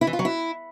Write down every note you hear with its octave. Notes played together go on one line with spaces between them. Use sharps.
E4
E3
F4
F#3
E4